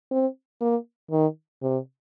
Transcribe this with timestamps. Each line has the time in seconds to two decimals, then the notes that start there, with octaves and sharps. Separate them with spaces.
0.11 C4
0.61 A#3
1.11 D#3
1.62 C3